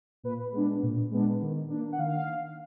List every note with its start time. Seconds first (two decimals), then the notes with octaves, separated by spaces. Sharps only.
0.23 A#2 B4
0.53 G#3 B3 D4
0.83 A#2
1.11 G#3 B3 D4
1.41 D#3
1.70 A#3 D4
1.92 F#5
1.99 D#3 F5